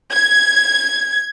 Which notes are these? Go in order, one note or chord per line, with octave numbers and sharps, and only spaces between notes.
G#6